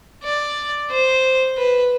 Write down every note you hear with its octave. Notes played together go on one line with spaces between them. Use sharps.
D5
C5
B4